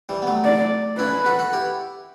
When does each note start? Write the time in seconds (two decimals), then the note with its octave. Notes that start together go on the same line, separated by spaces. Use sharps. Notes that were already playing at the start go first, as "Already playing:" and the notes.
0.09 E3 G3
0.22 B3
0.27 F#3 A3
0.45 D5
0.98 C#4 E4 B4
1.26 F#4 A4
1.39 F#4 A4
1.53 E4 G4